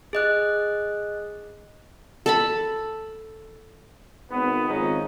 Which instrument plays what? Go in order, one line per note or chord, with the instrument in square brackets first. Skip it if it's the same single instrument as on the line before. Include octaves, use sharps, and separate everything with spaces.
[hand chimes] G#4 D#5 F#6
[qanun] A4 A5 B5
[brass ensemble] G#1 B3
F2 G#2 D#3 F3 C#4 D#4